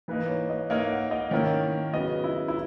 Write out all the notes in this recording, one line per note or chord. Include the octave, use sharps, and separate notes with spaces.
E3 A#3 D#4 B4
C#5
D#5
A#3 D#4 A#4 C#5 E5
F#5
D#5
D#3 A#3 C#4 E4 A#4 C#5
C#3 F#3 B3 D#5
E4
E4